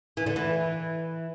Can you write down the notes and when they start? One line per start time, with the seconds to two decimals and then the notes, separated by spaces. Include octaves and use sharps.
0.17 E3
0.26 D3
0.36 E3